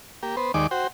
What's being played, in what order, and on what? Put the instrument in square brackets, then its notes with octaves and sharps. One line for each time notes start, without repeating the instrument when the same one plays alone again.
[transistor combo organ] A#3 G4
B3 C5
D#2 D#3 G#3 D5 D6
F#4 C5 G5